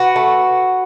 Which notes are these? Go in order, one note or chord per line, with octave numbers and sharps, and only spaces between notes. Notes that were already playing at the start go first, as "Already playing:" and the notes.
Already playing: F#4 B4
A3